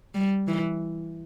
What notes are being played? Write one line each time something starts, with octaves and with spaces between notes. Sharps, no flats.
G3
E3